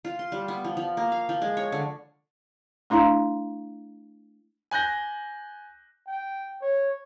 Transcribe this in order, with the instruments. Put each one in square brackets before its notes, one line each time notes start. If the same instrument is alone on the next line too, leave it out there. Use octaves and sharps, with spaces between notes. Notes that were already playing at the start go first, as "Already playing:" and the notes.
[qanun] F4
C6
G3
B3
F3
F3
A#3
F5
F3
G#3
C#5
D3
[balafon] A3 D4 E4 F5 A#5
[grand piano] G#5 F#6 G6 A#6
[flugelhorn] G5
C#5